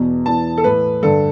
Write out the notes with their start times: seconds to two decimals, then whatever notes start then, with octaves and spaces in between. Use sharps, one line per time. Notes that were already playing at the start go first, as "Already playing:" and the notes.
Already playing: E2 B2
0.26 E2 E3 A5
0.58 A4
0.64 A2 E3 B4
1.02 G2 D3 A4